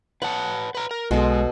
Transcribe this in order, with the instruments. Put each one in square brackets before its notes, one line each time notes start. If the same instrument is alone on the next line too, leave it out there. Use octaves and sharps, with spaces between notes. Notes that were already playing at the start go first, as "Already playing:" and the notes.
[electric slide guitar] B4 C#5 A5 [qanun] F#5
[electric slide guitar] B4 A#5
A#4
[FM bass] B1 [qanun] B2 A4 [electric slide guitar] G#3